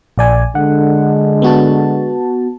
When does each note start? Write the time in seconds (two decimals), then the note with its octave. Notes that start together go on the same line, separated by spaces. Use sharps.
0.18 A#1 D5 G#5
0.55 D3 G#3 F#5
1.42 B3 F#4 A5